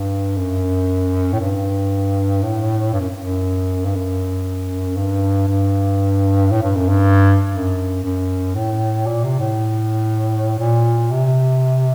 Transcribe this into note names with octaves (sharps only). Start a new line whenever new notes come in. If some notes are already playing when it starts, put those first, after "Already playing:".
Already playing: G2
F#2
A2
G2
A2
G2
F#2
F#2
G2
F#2
G2
G2
A2
G2
F#2
G2
F#2
F#2
A2
A#2
C3
A2
A#2
C3